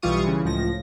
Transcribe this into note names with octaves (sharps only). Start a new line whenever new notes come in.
B1 E3 G3 F4 C#6 D#6
C#3 E3
C#2 A2 F3 A#6